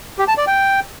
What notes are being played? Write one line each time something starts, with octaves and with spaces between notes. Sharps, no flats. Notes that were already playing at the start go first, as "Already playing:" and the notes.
G4
A5
D5
G5